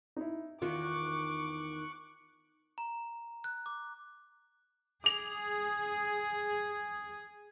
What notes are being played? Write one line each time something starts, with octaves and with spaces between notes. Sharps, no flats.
D#4 E4
E2 D#3 F4 C#6 D6 F#6
A#5
F#6
D6
G#4 D6 F7